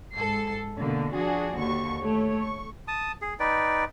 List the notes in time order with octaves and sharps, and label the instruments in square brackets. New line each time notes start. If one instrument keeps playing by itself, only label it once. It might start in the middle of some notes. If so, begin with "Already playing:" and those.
[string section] G#2 A4 C7
B2 D3 A#3
F3 D4 F#4 G#4
D#2 D3 C#6
A3 C#5
C#6
[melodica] A5 D#6
G#4
D#4 B4 D5 G5